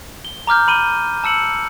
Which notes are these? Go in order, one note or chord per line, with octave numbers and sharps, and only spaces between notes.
G7
A#5 D6 F6 G6
B5 D#7 G7
A5 E6 C#7 F#7